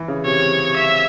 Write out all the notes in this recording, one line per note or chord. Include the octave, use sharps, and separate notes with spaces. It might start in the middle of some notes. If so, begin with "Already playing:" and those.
Already playing: E3
C#3
C3 C#5
E5